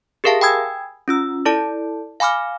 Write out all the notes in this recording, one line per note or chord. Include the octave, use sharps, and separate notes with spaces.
G4 G#4 A#4 E5 F5 A5
G5 G#5 B5 D#6 E6 G#6
C#4 F4 E6
E4 A4 D5 A5
F5 G#5 B5 D6 F6